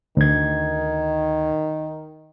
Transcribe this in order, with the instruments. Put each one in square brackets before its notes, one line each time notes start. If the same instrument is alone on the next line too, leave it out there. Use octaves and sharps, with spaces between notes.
[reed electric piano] D2 G#6 [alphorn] D#3